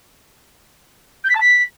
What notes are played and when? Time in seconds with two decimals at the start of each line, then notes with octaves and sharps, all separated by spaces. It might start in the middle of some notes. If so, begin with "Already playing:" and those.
1.24 G6
1.29 B6
1.35 A5
1.40 B6